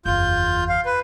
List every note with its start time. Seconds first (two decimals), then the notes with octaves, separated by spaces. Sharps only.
0.05 F#1 E2 F4 G6
0.69 F5
0.86 B4